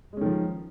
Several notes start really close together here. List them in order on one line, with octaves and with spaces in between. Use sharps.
G#3 C#4 D#3 F3